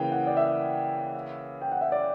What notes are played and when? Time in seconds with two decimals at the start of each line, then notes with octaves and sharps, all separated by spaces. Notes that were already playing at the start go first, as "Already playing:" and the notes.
Already playing: C#3 E3 A#3 G5
0.12 F#5
0.27 D5
0.37 E5
1.62 G5
1.72 F#5
1.81 E5
1.92 D5